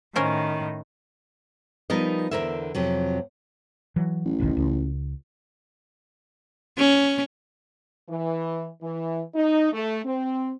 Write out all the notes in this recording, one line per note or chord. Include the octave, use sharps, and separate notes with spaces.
A2 D#3 C#4 A#4 C5
F3 G3 B3 D#4 A#4 D#5
E2 G#2 D3 A#4 C5 E5
F2 C3 F#3
E3 F#3
A1
E1 B1 D#3
C#2
C#4
E3
E3
D#4
A3
C4